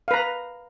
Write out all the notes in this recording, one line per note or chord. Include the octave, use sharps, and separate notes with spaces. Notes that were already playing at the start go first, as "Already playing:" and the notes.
B4 F5 A#5